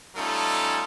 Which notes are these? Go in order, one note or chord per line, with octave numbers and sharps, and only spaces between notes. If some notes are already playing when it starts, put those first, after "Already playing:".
G3 A3 C#4 D#4 F4 A4